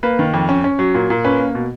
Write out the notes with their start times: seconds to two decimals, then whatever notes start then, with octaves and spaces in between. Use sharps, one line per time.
0.03 A#3 B4
0.19 D#3
0.34 F2
0.49 C#4
0.64 C#4
0.79 F#3
0.94 A#2
1.10 A#2
1.24 C#4 B4
1.40 A#3
1.55 B2